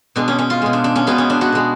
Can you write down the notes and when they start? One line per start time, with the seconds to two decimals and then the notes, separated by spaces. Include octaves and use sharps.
0.16 B2 G#3 D4
0.28 C#4
0.38 C#4
0.50 F4
0.62 B2 G#3
0.73 D4
0.84 D4
0.96 C#4
1.07 B2 G#3 B3
1.18 C#4
1.30 D4
1.41 F#4
1.52 B2 G#3